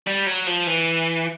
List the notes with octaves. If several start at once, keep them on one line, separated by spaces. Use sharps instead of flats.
G3
F#3
F3
E3